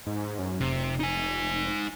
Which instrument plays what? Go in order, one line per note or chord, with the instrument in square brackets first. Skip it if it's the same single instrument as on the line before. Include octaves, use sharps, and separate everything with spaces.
[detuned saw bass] G#2
F#2
[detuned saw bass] F1 [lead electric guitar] C3
[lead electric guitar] D#4 G#5